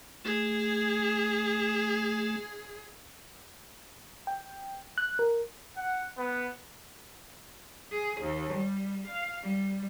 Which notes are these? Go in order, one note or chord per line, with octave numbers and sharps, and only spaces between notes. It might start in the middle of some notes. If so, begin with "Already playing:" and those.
A3 G#4
G5
F#6
A#4
F#5
B3
G#4
D#2
G3
F5
G3